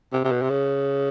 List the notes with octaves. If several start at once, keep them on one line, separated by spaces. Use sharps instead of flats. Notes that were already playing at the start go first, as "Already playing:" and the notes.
C3
C3
B2
C3
C#3